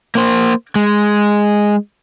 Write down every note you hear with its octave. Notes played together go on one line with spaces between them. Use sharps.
A#3 C5
G#3